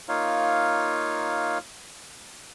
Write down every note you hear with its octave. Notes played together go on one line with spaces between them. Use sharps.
A#3 D#4 F4 C#5 F5